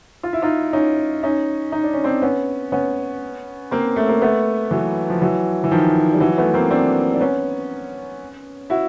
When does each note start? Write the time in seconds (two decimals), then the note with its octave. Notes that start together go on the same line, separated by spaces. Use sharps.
0.23 F4
0.33 E4
0.42 D#4 F4
0.73 C#4 D#4
1.23 C#4 D#4
1.72 D#4
1.83 D4
1.93 C#4
2.04 C4 D4
2.22 B3 C#4
2.72 B3 C#4
3.71 A#3 C4
3.96 A3
4.09 A#3
4.22 A3 B3
4.71 E3 F#3
5.10 F3
5.22 E3 F#3
5.64 E3
5.71 D#3 F3
6.13 G3
6.20 E3 F#3
6.38 A3 B3
6.54 A#3 C4
6.71 C4 D4
7.14 D4
7.20 B3 C#4
8.70 E4 F#4